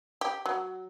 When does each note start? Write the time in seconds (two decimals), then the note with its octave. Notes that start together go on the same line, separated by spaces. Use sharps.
0.21 G4
0.46 F#3